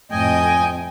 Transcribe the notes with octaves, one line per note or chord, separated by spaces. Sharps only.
F2 A2 D#5 G5 G#5